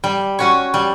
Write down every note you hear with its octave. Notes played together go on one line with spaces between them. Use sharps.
G3
C#4 F#4 C#5
G3